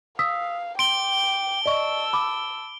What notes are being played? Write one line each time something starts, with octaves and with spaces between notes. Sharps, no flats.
F5 D#6 E6 B6
G5 C6 D6 D7 G7
D5 D#5 A5 C#6 E6
B5 D6